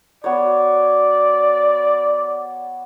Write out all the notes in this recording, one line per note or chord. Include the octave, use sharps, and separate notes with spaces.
B3 F#4 C#5 D5